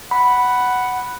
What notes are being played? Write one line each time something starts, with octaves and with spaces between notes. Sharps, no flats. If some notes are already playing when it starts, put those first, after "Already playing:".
F#5 B5